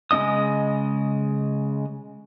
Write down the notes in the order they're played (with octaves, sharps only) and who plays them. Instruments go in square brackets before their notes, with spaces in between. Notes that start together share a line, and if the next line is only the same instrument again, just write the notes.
[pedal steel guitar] C#3 G#3 D4 D#5 D#6